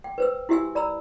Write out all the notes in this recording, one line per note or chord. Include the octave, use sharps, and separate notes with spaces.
G5
B4 C5 E6
E4 F#4 G4 E5 G#5 E6
D5 A#5 B5 E6